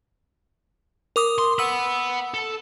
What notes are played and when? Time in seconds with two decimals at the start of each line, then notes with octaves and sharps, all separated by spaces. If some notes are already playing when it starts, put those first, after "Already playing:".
1.16 A#4 D6 D#6
1.39 C6
1.59 F#5 B5 E6
2.34 A4